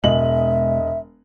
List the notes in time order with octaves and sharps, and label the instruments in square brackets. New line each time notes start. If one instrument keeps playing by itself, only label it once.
[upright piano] E1 D#5 F#7 [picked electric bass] B2 G#3 [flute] E5